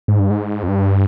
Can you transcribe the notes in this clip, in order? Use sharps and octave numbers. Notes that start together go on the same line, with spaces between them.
G#2
G2
G#2
F2
G2